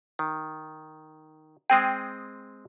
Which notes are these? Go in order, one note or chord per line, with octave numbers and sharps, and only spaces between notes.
D#3
G#3 C4 G#4 G5 D#6